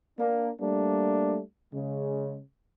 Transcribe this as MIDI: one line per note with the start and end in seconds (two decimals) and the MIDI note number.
0.19 0.49 58
0.19 0.49 62
0.60 1.39 55
0.60 1.39 57
0.60 1.39 58
0.60 1.39 62
1.72 2.38 49
1.72 2.38 56